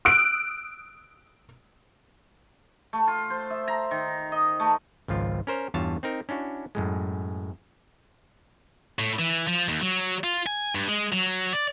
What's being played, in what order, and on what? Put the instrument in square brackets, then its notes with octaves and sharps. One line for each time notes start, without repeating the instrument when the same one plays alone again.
[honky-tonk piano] D#6 E6 F#6 D7
[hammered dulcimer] A3
F4
C5
E5
A#5
D#3
D#5
A3
[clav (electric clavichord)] G#1 C#2 F3 F4
C#4 A#4 C5
E2 G2 F4 C#5 A5
C4 D#4 A#4
C#4 D4 E4 F#4
F#2 A2 G#3
[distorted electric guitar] A2
E3
F3
D#2
F#3
F4
G#5
G2
G#3
F#3
D5